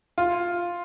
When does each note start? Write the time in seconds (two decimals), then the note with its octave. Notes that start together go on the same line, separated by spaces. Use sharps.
0.18 F4